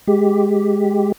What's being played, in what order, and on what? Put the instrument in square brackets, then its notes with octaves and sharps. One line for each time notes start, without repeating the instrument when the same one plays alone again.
[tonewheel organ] G#3 G4